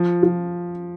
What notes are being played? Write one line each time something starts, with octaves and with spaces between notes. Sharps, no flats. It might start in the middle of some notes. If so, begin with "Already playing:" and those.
Already playing: F3
F3